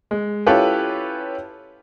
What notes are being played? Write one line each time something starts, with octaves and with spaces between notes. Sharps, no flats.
G#3
C#4 E4 F4 G4 A4 B4